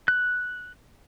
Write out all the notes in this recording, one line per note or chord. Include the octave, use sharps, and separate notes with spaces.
F#6